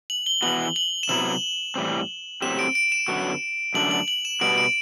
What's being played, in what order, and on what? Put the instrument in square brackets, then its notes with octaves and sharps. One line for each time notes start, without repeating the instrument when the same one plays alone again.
[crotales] F#7
G7
[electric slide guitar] E3 B3 F#4 [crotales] F#7
[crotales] F#7
E7
[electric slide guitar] C3 F#3 B3 E4 [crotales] F#7
[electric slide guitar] A2 E3 G3 C4
[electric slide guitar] A2 F#3 C4 G4 [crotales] E7
[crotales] D7
D7
E7
[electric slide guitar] F#2 D3 F#3 B3 F#4
[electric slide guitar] F#2 D3 A3 D4 [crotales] F#7
[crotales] F#7
F#7
E7
[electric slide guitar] B2 G3 B3 F#4 [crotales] D7
[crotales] D7